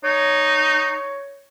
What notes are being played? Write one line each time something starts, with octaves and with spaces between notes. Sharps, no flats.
D#4 C#5